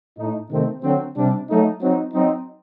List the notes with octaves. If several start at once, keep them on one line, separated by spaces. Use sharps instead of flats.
A2 A3 D#4
C3 D#3 A3 C4
D3 F#3 C4
C3 G3 D4
F#3 A3 D#4
F#3 C4 D#4
F#3 C4 D#4